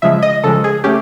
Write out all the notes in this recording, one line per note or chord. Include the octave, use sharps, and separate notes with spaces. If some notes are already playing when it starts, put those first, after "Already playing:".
C#3 F3 G#3 E5
D#5
C#3 F3 G#3 A4
G#4
A3 C#4 G4